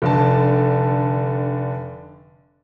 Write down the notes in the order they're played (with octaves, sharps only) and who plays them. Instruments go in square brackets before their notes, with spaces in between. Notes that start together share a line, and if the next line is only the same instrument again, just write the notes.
[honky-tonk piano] F1 D3 A5